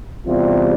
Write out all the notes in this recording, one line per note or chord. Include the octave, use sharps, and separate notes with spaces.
E2 C3 G3 F4